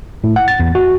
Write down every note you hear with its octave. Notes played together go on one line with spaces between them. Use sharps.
A2
F#5
A6
E2
F#4